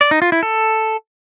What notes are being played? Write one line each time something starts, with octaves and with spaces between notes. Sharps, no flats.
D5
D#4
F4
E4
A4